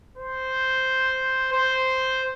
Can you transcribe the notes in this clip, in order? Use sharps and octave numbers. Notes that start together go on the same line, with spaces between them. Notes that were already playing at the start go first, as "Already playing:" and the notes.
C5
C5